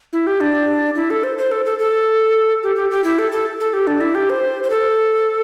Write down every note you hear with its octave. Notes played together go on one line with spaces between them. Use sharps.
E4
G4
D4
E4
A4
C5
C5
A4
A4
A4
G4
G4
G4
E4
A4
A4
A4
G4
D4
E4
G4
C5
C5
A4